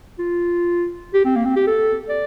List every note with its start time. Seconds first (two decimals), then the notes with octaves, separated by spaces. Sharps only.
0.19 F4
1.14 G4
1.25 C4
1.36 A#3
1.45 C4
1.56 G4
1.67 A4
2.09 D5